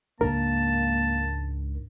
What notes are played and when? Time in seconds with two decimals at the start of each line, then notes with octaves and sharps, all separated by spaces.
0.21 C#2 G#2 A#3 D4 A#4 A5